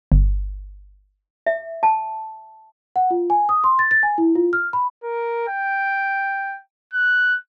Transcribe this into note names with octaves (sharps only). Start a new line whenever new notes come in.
G1
E5
A5
F#5
F4
G#5
D#6
C6
A6
A6
G#5
E4
F4
F6
B5
A#4
G5
F#6